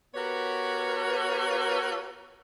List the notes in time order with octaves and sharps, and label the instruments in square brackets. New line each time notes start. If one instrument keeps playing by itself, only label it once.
[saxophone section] B3 F#4 G4 A#4 B4 C#5